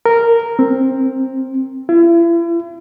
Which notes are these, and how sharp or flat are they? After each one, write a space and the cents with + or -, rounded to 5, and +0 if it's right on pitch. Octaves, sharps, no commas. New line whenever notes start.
A#4 -5
C4 +10
E4 +40